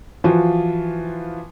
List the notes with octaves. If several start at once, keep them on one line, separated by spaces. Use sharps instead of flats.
E3 F3 F4 F#4